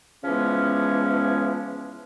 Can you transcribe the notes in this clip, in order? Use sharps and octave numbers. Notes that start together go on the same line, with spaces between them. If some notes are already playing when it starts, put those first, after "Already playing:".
C#3 E3 F3 G#3 B3 C#4